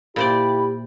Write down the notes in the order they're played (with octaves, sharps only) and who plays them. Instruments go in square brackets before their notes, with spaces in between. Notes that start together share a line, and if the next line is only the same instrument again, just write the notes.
[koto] A#2 C5 D5 [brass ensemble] E4 G4 [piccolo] B5